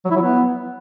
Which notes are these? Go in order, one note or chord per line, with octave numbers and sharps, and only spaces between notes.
F#3
E4
F#3
B3